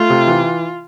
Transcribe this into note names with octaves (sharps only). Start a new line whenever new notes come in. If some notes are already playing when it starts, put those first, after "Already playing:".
Already playing: A3 F4
C3
E3